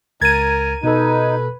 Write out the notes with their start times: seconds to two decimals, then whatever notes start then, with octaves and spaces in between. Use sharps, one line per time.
0.21 C#2 A#4 G#6 A6 D#7
0.83 B2 D#4 A4 B4